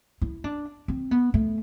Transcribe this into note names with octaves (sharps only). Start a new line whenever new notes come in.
E4
D4
C4
B3
A3